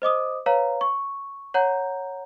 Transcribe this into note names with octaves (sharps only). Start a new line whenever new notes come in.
C5 D#5 D6 D#6
B4 C#5 F5 A#5
C#6
C#5 F#5 A#5 G6